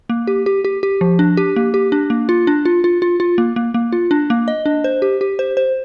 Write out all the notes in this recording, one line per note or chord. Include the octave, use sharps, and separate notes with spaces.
A#3
G4
G4
G4
G4
F3
D4
G4
A#3
G4
D4
A#3
F4
D4
F4
F4
F4
F4
A#3
A#3
A#3
F4
D4
A#3
D#5
D4
C5
G4
G4
C5
C5